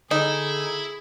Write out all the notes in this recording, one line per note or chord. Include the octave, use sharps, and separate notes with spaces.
D3 D#4 E4 G#4